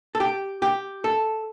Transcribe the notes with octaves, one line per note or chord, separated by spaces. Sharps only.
A4
G4
G4
A4